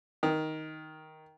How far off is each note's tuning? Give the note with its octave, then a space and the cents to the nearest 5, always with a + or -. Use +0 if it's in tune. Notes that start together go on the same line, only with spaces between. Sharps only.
D#3 +5